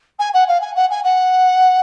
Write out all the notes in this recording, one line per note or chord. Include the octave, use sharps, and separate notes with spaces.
G#5
F#5
F5
G#5
F#5
G#5
F#5